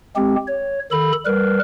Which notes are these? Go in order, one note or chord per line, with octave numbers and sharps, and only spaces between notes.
G#3 C4 G4
C#5
D#3 A4 B5
G3 A#4 B4